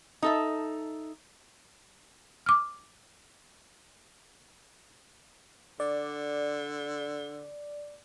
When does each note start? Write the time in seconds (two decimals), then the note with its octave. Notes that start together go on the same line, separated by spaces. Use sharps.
0.22 D#4 A4 E5
2.46 D6 F6
5.80 D3 D5